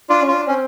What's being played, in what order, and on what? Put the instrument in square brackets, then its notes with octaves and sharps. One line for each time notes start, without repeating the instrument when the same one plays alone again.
[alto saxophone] D4 [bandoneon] F4
[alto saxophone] C#4
[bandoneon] F4
[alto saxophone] D4
[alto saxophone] C4 [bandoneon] C#4